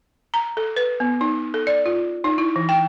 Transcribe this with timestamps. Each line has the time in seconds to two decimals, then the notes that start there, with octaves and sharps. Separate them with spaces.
0.34 A#5
0.57 A4
0.76 B4
1.00 B3
1.21 D#4
1.54 A4
1.67 D5
1.86 F4
2.24 D#4
2.38 E4
2.56 E3
2.69 G5